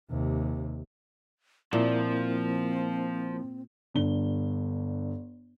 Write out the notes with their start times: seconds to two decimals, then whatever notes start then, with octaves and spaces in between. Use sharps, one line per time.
0.10 D#2 C3
1.73 A#2 F3 A#3 C4 E4 A#4
3.94 G1 G2 G7